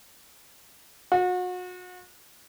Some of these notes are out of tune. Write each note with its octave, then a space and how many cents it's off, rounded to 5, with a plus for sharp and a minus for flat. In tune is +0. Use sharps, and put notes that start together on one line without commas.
F#4 -35